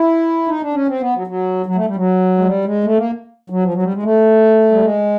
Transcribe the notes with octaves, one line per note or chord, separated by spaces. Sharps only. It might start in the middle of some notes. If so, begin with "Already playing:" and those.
Already playing: E4
D#4
D4
C#4
C4
B3
F#3
F#3
F#3
A3
G3
F#3
G#3
G3
G#3
A3
A#3
F#3
F3
F#3
G3
G#3
A3
G3
G#3